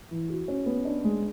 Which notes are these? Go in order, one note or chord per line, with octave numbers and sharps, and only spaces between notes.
E3
F#4
C#4
B3
D4
G#3